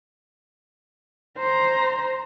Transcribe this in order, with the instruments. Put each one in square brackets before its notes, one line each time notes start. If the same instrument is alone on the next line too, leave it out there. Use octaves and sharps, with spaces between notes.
[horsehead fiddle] C5 A#5